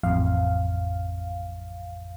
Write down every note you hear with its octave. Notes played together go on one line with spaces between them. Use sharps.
A1 F2 F5